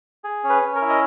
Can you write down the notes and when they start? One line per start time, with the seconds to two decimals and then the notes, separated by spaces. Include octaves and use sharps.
0.24 G#4
0.44 C#4
0.49 B4
0.62 C#4
0.75 A#4
0.82 E4
0.90 D#5